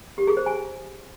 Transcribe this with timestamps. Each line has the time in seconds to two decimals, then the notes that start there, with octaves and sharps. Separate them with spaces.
0.18 G4
0.27 G#4
0.37 C5
0.46 G#5